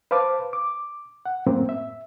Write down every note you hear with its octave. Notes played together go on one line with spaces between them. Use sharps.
B4 C5 F5 A5 D6
D6
F#5
F#2 A2 A#3 C4
E5